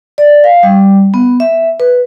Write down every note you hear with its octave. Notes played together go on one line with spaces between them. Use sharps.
D5
F5
G3
B3
E5
B4